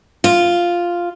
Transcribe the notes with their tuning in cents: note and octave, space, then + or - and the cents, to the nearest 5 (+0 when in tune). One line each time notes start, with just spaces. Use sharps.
F4 +0